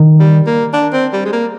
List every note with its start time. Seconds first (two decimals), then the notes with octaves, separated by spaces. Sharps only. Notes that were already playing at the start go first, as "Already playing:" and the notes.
Already playing: D#3
0.20 G3
0.47 A#3
0.73 D4
0.92 C4
1.13 G3
1.26 G#3
1.33 A#3